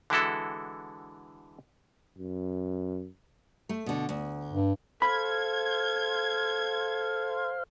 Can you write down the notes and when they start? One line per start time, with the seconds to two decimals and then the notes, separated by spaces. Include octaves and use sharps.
0.10 D3 E3 G#3 E4 F#4 A4
2.18 F#2
3.69 A3
3.86 B2 D3
4.09 D2
4.52 G2
5.02 A4 C5 F5 B5 G#6